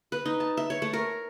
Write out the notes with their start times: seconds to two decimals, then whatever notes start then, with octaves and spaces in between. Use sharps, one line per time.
0.12 B4
0.25 D#4
0.40 A5
0.57 E5
0.70 C#5
0.82 A3
0.93 A#4